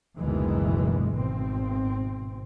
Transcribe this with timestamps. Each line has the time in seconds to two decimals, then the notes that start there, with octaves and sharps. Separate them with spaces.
0.18 F#1 D2 B2 D#3 E3 G#3
1.13 G#1 B2 C4